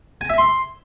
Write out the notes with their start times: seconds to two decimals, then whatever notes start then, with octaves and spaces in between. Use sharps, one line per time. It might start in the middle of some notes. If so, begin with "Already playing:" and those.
0.21 G#5
0.30 E5
0.38 C6